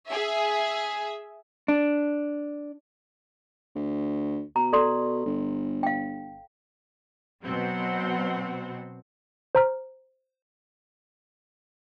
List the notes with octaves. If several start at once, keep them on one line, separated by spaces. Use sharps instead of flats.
G#4 E5
D4
D2
B2 A#5
A4 D5 C6
G1
F5 G5
B2 F#3 C4 F#5
C5 A#5 F6